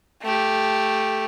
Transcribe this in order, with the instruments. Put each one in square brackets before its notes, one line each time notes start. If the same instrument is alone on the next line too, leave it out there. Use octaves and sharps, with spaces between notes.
[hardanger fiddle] A3 G4